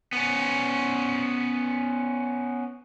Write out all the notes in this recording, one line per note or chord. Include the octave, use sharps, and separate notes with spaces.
B3 C#4